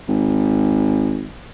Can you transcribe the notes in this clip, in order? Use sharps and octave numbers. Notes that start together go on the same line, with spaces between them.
G#1